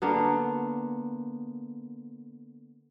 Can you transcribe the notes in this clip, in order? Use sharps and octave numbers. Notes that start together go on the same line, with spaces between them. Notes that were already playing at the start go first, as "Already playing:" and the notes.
D3 A#3 B3